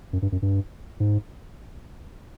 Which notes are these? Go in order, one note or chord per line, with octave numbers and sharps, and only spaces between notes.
F#2
G2
F#2
G2
G#2